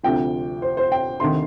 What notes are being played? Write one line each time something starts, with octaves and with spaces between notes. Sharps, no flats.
D2 C3 F3 G5
C5
C5
G5
D2 C3 D#3 C6